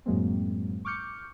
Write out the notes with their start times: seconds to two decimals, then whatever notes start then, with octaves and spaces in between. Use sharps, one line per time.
0.06 F#2 A2 F#3 G#3 A#3 C4
0.85 C#6 D6 F6 G6 C#7